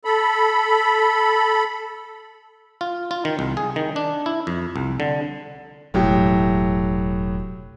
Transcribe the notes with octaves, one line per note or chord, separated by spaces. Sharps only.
A4 B5
F4
F4
D#3
C2
G#4
D#3
D4
E4
F2
C2
D3
E1 A2 F#3 G4